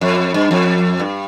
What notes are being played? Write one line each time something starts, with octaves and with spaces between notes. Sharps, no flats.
F2
G2
F2
G2